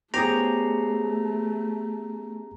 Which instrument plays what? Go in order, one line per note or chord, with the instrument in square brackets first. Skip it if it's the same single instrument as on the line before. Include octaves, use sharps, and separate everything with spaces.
[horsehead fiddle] A3 [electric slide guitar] B3 C#4 C5 [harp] G4 G#4 [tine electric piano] A#5